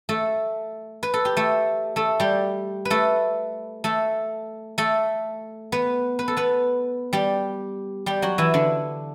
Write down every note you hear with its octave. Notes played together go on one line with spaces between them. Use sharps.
A3 A4
B4
A4
G4
A3 A4
A3 A4
G3 G4
B4
A3 A4
A3 A4
A3 A4
B3 B4
B4
A4
B3 B4
G3 G4
G3 G4
F#3 F#4
E3 E4
D3 D4